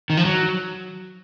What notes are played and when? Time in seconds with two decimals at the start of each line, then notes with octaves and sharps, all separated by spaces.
0.10 D#3
0.17 F3
0.25 F#3